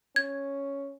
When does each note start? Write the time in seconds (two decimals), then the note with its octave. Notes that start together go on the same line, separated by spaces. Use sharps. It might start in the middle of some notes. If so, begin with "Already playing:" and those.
0.16 C#4 G#6